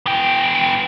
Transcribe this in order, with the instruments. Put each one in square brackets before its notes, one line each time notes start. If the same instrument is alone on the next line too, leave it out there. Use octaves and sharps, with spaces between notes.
[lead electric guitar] B3 G5